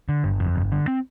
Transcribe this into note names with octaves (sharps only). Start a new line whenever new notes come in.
D3
G1
F2
G1
D3
C4